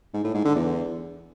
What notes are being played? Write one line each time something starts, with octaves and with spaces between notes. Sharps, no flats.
G#2
A2
G#2
D3
E2